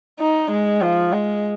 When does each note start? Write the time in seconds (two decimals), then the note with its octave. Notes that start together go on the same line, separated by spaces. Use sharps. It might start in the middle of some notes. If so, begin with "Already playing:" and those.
0.20 D#4
0.51 G#3
0.82 F3
1.12 G#3